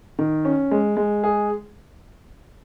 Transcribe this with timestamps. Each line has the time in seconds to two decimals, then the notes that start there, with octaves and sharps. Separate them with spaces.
0.19 D#3
0.45 C#4
0.71 G#3
0.97 G#3
1.24 G#4